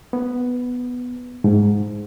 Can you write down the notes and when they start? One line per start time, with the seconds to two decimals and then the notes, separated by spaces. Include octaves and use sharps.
0.13 B3
1.44 G#2